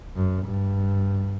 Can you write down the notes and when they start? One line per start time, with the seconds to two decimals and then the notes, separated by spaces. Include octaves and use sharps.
0.16 F#2
0.46 G2